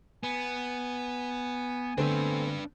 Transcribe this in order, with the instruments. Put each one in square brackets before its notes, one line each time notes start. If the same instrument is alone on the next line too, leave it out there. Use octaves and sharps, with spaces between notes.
[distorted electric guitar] B3 [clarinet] G#5
[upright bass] D3 [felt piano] A3 B3 C4 [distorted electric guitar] D4 B4